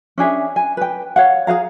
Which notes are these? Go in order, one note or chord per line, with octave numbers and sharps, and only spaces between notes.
C#4 D4 G#4 E5
G#5
B4 G5
C#5 F5 F#5
G#4 C5 F5 A#5